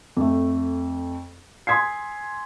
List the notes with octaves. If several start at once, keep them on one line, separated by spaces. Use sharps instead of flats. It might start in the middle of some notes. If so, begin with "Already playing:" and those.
F2 A3
G#5 C6 D#6 G#6 B6 C7